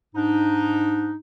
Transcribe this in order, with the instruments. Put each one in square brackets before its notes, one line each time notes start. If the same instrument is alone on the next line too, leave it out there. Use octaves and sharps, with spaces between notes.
[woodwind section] G#2 D4 D#4